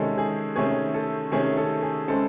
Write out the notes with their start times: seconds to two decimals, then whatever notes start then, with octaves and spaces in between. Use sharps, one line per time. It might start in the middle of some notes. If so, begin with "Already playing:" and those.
Already playing: C3 D#3 G#3 C#4 A4
0.18 G#4
0.56 C3 D#3 A3 C#4 G#4
0.94 A4
1.32 C3 D#3 A3 C#4 G#4
1.57 A4
1.82 G#4
2.08 C#3 G#3 C4 A4